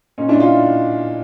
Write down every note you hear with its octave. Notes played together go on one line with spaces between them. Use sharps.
A#2 C#4 D#4
D4 E4
A#2
D#4 F4